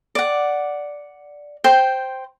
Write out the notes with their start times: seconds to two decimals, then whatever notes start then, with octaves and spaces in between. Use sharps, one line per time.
0.15 D5 F#5
1.64 C5 G5